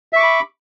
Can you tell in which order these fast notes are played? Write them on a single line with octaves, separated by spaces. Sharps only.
E5 C#6 D6 B5